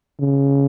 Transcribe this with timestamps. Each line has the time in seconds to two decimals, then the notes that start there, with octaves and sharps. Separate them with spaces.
0.19 C#3